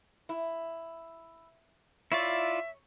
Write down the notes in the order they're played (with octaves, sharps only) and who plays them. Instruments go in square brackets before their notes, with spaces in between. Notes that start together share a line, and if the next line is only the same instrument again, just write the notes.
[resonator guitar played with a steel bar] E4
[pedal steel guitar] E4 F4 D5 [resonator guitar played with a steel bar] C#5 [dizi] E5